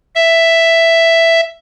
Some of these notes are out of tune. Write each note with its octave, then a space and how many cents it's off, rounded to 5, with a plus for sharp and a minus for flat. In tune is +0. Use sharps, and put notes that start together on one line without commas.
E5 +5